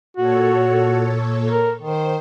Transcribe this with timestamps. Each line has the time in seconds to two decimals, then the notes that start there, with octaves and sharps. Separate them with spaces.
0.17 A#2 F#4 A4 C#5
1.51 A#4
1.82 D#3 C5